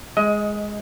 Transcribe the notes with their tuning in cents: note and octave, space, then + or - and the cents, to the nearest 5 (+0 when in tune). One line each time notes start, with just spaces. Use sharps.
G#3 +0 D#5 +20